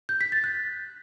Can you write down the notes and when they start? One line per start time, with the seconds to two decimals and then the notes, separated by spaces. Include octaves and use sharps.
0.09 G6
0.21 B6
0.32 A6
0.44 F#6